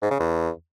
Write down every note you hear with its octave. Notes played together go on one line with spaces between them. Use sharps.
G#2
C#3
E2